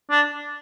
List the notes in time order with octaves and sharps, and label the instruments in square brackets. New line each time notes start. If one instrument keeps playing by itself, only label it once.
[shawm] D4